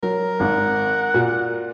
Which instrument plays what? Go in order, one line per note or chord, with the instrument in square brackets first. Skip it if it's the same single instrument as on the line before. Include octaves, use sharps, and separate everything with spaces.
[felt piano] F#3 [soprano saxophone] A#4
[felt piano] G#1 [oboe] F#5
[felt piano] A#2 A#3 F#4